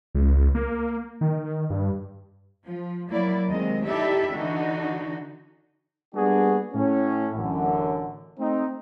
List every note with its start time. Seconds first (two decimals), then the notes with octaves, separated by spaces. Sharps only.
0.15 C#2
0.55 A#3
1.21 D#3
1.70 G2
2.65 F3
3.10 F#3 A#3 E4 D5
3.48 D#2 D#3 G#3 C4 D#5
3.84 D#4 E4 G4 A4 D5 E5
4.32 D3 E3 D4 D#4 F#4
6.14 G3 A#3 B3 D4 F#4 G#4
6.74 A2 C#4
7.35 A1 F#2 D3
8.39 A3 C4 D#4